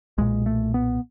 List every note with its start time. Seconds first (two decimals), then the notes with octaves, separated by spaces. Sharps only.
0.18 B1 A#2 G#3
0.46 A3
0.74 B3